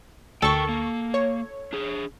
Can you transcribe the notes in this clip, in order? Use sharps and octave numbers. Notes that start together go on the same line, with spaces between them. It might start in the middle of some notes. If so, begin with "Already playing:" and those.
D2 A4 A#4 G5 C#6
A#3
C#5
D4 G#4